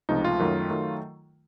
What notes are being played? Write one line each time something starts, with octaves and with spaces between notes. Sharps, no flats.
C#2 C3 F3 A3 D#4
F4
F#2 D#3 F#3 A3
D#3 F#3 A3